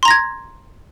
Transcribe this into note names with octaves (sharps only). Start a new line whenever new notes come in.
A#5 C6 G#6 A#6